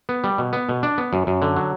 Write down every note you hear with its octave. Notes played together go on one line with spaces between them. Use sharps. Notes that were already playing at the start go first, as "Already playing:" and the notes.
B3
G3
B2
B3
B2
D4
B3
F#2
F#2
D3
F#3